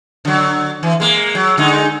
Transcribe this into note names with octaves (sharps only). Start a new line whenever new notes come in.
D3 F#3
E3
G#3 A#3
F#3
D3 G#3 D#4